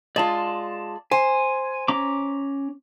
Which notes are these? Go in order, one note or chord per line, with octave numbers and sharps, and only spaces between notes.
G#3 F4 D5 A5
C5 G#5
C#4 A#5 D6